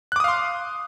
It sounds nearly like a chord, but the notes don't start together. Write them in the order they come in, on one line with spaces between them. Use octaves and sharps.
F#6 D6 D#6 F5 C6